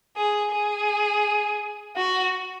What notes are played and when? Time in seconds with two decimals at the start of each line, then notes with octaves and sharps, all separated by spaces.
0.15 G#4
0.52 G#4
1.96 F#4